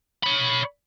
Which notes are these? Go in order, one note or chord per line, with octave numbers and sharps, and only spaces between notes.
C#5 B5